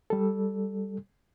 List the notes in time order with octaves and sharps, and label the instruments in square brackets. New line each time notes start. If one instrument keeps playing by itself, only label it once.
[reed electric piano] G3 A4